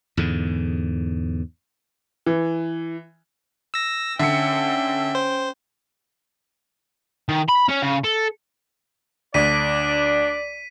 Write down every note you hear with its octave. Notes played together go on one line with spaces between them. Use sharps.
E2 G#2 D3
E3
E6 A#6
D3 C#4 E5 G5 C#7
C5
D#3
B5
C#4
C#3
A4
D2 D4 D5 B6 D#7